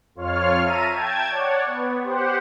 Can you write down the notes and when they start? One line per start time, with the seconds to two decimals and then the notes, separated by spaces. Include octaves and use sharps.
0.15 F2 F4 C#5 F5 F6
0.63 E5 A5 A#5 D#7
0.92 G5 A5 G#6
1.29 C#5 D5 F#5
1.66 B3
2.02 G4 C5 F#5